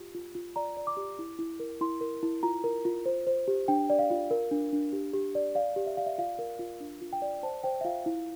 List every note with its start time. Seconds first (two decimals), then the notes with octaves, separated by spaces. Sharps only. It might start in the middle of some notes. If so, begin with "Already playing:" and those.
Already playing: F4 G4
0.15 F4
0.35 F4
0.56 D5 A#5
0.77 D5
0.87 D6
0.97 G4
1.19 E4
1.39 E4
1.60 A#4
1.81 E4 C6
2.01 A#4
2.23 E4
2.43 F4 A#5
2.64 A#4
2.85 F4
3.06 C5
3.27 C5
3.48 G4
3.68 D4 G5
3.90 D5
3.99 F5
4.10 F4
4.31 A#4
4.51 D4
4.73 D4
4.93 G4
5.14 G4
5.35 D5
5.55 D5 F5
5.76 G4
5.86 E5
5.97 D5 F5
6.07 E5
6.18 F4 F5
6.39 A#4
6.59 F4
6.80 D4
7.01 F4
7.13 G5
7.22 D5
7.43 C5 A5
7.63 C5 G5
7.81 E5
7.85 F4 F5
8.06 E4